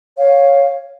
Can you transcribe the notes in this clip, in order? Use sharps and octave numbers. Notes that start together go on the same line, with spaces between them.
C#5 F5